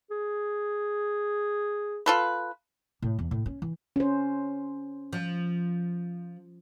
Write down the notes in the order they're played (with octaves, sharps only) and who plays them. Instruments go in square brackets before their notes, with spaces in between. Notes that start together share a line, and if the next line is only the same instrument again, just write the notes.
[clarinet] G#4
[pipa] F4 A4 B4
[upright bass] A2
E2
A2
C#4
E3
[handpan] C#4 C5
[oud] F3